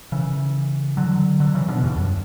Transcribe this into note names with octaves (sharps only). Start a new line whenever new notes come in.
C#3 E3
D3 F#3
D3 F#3
C#3 E3
B2 D3
E2 G2
F#2